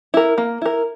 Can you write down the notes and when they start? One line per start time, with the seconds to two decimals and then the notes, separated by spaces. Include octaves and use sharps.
0.14 E4 A#4
0.38 A#3
0.62 E4 A#4